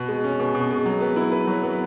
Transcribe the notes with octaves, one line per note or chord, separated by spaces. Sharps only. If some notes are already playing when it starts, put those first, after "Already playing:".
Already playing: B2
G#3
C#4
B2
B2
G#3
F#3
B3
E4
B4
F#3
B3